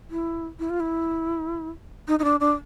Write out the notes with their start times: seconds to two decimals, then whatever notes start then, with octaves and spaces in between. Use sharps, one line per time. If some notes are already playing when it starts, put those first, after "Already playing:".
0.10 E4
0.59 E4
0.70 F4
0.80 E4
2.08 D#4
2.19 D#4
2.24 D4
2.40 D4